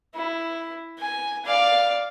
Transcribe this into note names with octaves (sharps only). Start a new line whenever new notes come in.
E4
G#5
D5 F5